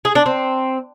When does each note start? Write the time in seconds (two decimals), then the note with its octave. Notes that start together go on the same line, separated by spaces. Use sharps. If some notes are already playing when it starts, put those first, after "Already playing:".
0.05 G#4
0.15 D4
0.26 C4